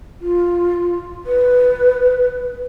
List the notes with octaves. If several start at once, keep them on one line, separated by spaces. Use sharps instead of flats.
F4
B4